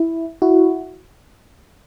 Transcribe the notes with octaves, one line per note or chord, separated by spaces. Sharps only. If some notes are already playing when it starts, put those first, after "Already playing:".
Already playing: E4
E4 F#4